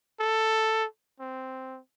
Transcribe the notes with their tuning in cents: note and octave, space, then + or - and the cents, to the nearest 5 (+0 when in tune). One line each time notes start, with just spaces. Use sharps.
A4 +5
C4 -5